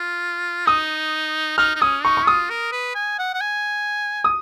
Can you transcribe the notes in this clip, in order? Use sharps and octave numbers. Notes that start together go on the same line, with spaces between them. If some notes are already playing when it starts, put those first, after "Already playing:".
Already playing: F4
D#4 D#6
D#4 F6
D#4
C#4 D#6
D#4 C#6
C#6
F4 D#6
A#4
B4
G#5
F#5
F#5
G#5
D#6